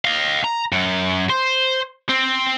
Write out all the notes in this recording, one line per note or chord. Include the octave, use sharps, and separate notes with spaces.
D#5 F5
A#5
F#2
C5
C4